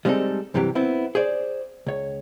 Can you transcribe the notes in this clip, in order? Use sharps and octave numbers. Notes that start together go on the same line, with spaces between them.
G3 G#3 B3 C4 D#4 A4
G2 C3 E3 F#3 G4
B3 C4 E4
G#4 C5 D5
C#2 C#5